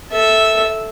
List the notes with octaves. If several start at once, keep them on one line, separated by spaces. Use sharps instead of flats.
A4 E5